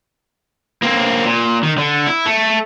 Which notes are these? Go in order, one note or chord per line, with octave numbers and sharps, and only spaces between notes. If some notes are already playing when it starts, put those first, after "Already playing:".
A#3 C4
A#2
D#3
D3
E4
A3